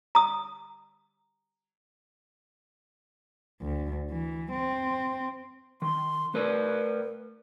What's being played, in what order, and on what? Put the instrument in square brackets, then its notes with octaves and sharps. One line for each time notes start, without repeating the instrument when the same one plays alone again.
[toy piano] A#5 D#6
[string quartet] D2
E3
C4
[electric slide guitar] D#3 [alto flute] C6
[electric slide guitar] A3 B4 D5 [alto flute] A#4